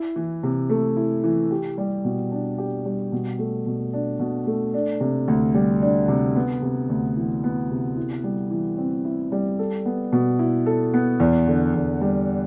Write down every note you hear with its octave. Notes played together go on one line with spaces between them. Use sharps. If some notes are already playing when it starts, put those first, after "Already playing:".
Already playing: E4
E3
C3
A3
E4
E3
G4
G3
B2
D4
G4
G3
B2
A3
B2
D4
B2
A3
D4
C3
D2
G3
D4
C3
B3
C3
D2
E3
B3
C3
E4
G3
E3
C4
E4
G3
A4
B3
B2
E4
A4
B3
E2
D3
E2
G3